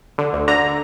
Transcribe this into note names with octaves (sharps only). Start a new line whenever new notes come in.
D3
D2
D3 A#5